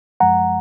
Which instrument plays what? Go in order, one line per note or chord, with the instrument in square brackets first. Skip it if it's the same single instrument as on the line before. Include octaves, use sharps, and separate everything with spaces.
[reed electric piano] F#2 F3 G#3 F#5 A#5